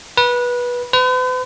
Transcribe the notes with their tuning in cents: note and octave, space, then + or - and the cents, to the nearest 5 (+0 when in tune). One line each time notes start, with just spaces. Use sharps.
B4 -20
B4 +45